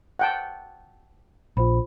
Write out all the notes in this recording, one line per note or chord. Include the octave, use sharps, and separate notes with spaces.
F#5 G5 A5
A#1 F4 C5 B5